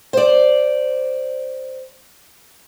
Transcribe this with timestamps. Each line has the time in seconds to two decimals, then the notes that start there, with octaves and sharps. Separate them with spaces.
0.13 C5 D5